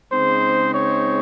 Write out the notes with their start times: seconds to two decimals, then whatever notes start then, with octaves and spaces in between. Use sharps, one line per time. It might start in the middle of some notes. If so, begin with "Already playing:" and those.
0.11 C#3 G#3 C4 D#4 C5
0.74 C#5